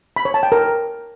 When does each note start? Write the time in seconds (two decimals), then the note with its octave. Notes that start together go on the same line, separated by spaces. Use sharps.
0.16 B5
0.25 C#5
0.34 A5
0.43 G5
0.52 A#4